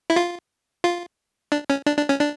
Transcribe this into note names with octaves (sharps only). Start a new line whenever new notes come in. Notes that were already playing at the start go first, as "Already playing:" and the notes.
E4
F4
F4
D4
C#4
D4
D4
C#4
D4